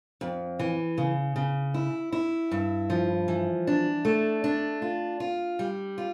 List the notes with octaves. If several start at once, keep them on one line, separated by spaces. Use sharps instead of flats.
F2
E3
C#3
C#3
E4
E4
G2
F3
E3
D4
A3
D4
F4
F4
G3
F4